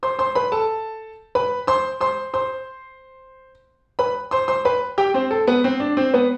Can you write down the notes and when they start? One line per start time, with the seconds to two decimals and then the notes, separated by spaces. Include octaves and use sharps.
0.03 C5 C6
0.19 C5 C6
0.35 B4 B5
0.52 A4 A5
1.35 B4 B5
1.67 C5 C6
2.01 C5 C6
2.34 C5 C6
3.99 B4 B5
4.31 C5 C6
4.48 C5 C6
4.65 B4 B5
4.98 G4 G5
5.14 C4 C5
5.31 A4
5.47 B3 B4
5.64 C4 C5
5.80 D4 D5
5.97 C4 C5
6.14 B3 B4